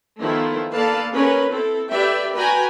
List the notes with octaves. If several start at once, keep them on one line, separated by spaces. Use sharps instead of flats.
D#3 F3 A3 B3 E4
A#3 A4 B4 D5 F5 A5
C#4 G#4 A#4 B4
C4 E4 A4
G4 B4 D5 E5 G5
F#4 B4 G5 G#5 A#5